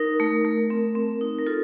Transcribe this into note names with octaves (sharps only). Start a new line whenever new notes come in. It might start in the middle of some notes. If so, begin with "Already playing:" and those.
Already playing: D#4 A#4
A3
A3
C4
C4
D#4
A#4
F4 A4